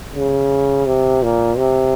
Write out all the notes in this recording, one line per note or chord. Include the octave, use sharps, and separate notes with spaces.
C#3
C3
A#2
C3